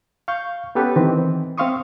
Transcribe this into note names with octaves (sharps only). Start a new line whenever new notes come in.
F5 C#6 G6
B3 C#4 G4 A4 B4
D#3 E3 C4
C4 E5 F5 C6 C#6 D#6